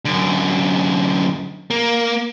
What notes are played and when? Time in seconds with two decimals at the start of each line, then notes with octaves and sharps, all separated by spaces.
0.05 F#2 D3
1.71 A#3